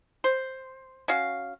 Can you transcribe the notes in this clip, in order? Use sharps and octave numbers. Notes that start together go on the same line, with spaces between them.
C5
C#4 F#4 F5